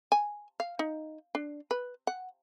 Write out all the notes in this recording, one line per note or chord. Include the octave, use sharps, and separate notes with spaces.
G#5
F5
D#4
D4
B4
F#5